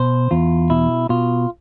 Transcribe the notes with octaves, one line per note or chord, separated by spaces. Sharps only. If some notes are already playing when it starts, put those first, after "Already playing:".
Already playing: B2 C5
E2 F4
B2 E4
B2 F4